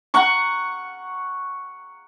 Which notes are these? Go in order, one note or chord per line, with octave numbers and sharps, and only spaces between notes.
F#5 A#5 C#6